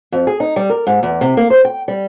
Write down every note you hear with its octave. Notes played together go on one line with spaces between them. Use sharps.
F2
G#4
D#4
G3
A#4
G#2
E2
C3
A#3
C5
G5
G3